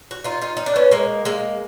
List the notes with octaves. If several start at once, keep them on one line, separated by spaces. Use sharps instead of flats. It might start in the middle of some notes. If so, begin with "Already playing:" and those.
F#4
D#4 F4
D#4 F4
D#4
D4
B3 C#4
G#3 A#3
G#3 A#3